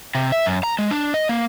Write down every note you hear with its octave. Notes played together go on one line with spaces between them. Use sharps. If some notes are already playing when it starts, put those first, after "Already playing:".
C3
E5
F#2
A#5
G#3
D4
D#5
A#3